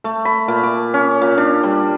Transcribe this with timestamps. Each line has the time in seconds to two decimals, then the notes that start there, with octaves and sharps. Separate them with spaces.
0.04 A3
0.25 B5
0.48 A#2
0.63 D6
0.94 C#4
1.21 A#2
1.38 D4
1.63 G3